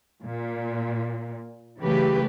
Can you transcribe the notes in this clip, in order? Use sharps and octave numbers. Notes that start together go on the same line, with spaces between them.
A#2
C#3 E3 F#3 A3 G4 B4